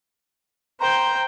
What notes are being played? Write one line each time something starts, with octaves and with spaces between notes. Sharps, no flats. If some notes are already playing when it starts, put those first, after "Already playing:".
C5 G5 A#5